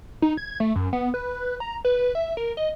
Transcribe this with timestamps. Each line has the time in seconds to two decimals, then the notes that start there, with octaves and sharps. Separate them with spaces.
0.22 D#4
0.37 G#6
0.60 A3
0.76 F#2
0.93 B3
1.14 B4
1.60 A#5
1.85 B4
2.15 E5
2.37 A#4
2.57 D#5